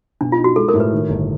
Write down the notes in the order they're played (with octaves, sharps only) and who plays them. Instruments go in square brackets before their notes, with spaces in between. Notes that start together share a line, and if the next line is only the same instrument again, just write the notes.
[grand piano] B2 [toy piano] D4
[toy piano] F4
[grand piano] D#4
[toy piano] F#4
[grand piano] G#3 [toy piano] A4
[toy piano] A#4
[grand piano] A2
[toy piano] B4
[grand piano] D#3
G1